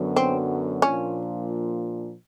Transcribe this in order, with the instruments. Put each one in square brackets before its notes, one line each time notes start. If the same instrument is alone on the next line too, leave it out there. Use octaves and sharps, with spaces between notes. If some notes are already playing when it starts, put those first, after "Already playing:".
Already playing: [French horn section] F#2 D3 F#3 B3
[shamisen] C4
[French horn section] A#2 F3 A#3 D4 F4 [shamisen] C#4